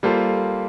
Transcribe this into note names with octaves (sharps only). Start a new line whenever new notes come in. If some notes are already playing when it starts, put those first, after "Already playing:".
G3 A#3 F4 A4 C5